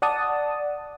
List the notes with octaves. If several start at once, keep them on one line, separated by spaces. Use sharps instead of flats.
D5 F#5 A5 D#6